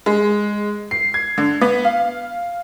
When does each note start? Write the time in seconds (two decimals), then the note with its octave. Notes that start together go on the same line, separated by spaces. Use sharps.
0.06 G#3
0.91 C7
1.14 G#6
1.38 D3
1.61 B3
1.85 F5